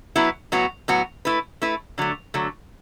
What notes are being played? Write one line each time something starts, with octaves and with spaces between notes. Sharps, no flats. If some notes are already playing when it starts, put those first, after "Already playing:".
F#3 B3 E4 B4
A2 F#3 B3 F#4
A2 F#3 B3 F#4
A3 E4 B4
A3 E4 B4
D3 F#3 A3
D3 F#3 A3